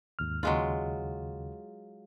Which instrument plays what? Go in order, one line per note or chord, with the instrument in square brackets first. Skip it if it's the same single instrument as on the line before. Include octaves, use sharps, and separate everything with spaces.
[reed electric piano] D#2 G#2 F6
[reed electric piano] D#2 C#3 [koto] F#3 G#3 F4